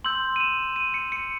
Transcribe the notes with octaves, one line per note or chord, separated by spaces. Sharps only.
C6 E6 G6 F#7
D#7
E7
D#7
C#7
C#7